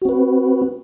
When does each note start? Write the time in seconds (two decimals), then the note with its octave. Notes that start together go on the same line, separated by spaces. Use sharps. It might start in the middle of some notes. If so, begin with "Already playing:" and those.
0.02 F#4
0.05 C4
0.09 B4